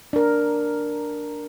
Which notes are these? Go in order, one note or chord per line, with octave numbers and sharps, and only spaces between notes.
D4 A#4